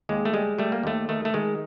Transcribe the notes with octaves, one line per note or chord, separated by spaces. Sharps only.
D#2 G#3
A3
G3 G#3
G3 A3
A#3
D#2 A3
D#3 A3
A3
D#3 G#3